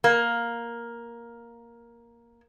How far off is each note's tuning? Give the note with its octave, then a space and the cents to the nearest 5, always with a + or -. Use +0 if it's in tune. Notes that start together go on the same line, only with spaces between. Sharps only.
A#3 +5